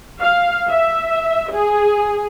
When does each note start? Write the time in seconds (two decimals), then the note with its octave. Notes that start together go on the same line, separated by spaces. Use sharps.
0.22 F5
0.70 E5
1.52 G#4